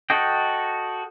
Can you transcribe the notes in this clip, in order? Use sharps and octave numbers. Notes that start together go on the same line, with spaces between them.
F#4 A4 D#5 G5